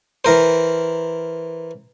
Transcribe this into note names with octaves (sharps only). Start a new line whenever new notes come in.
E3 A#4 C5